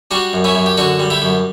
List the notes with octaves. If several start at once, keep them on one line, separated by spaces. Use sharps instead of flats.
G3 D4 F#4
F#2
C#4 E4
F#2
G4
D3 D4 F#4
G3
E4 G4
F#2